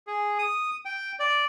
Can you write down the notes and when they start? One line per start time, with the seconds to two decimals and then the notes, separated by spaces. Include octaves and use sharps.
0.07 G#4
0.39 D#6
0.85 G5
1.19 D5